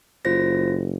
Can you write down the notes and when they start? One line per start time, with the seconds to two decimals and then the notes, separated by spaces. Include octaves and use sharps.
0.25 F#1 F4 C5 A#6